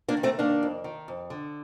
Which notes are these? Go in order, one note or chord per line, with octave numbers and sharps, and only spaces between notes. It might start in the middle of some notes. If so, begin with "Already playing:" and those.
A#3 D4
D#3
A3 C4
D#3 A#3 D4
F2
D#3
F2
D3